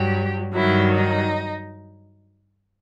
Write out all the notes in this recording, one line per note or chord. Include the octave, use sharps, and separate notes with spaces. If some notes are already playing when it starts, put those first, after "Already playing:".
Already playing: G2 F#3 G4
G2 D#3 F#3 E4
D#4